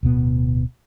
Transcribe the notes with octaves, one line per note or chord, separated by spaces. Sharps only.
D1 B2 B3